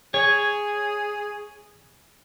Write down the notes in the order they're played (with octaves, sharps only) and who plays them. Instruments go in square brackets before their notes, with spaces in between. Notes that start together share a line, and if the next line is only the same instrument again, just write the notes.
[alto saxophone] G#4 [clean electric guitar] C#5 [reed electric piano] G#6